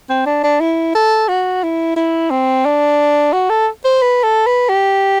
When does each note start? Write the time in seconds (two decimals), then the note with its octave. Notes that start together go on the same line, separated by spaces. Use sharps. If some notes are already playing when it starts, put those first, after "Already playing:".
0.09 C4
0.26 D4
0.44 D4
0.61 E4
0.95 A4
1.28 F#4
1.63 E4
1.96 E4
2.31 C4
2.65 D4
3.33 F#4
3.50 A4
3.85 C5
4.02 B4
4.23 A4
4.47 B4
4.69 G4